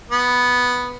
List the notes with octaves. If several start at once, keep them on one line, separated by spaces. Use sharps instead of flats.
B3